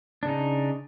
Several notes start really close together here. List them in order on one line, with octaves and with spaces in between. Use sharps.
D4 C#3 D#4